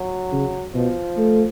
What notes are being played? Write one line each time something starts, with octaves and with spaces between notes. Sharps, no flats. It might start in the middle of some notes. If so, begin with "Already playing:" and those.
Already playing: F#3
C#3
B2 F3
A3